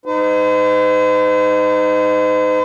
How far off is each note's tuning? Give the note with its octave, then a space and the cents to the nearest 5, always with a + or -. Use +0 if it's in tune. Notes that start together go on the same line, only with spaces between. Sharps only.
D#4 -10 C5 -45